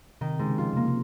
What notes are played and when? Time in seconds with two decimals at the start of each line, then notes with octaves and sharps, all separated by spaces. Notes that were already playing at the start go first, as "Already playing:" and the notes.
0.21 C3 D#3
0.39 G#2 C#3
0.58 F3 F4
0.73 C3
0.76 C#3 A#3
0.88 C3